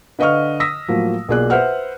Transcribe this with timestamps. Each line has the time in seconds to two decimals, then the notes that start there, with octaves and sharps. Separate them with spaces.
0.19 D3 B4 D#5 F5 C#6 F6
0.60 D#6 E6 A#6 B6
0.89 A2 F3 F#3 A#3
1.28 B1 A#3 F4 G#4 D5 F#6
1.50 B4 C5 E5 F#5 F6